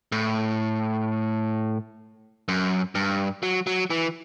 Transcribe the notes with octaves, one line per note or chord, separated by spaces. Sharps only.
A2
F#2
G2
F#3
F#3
E3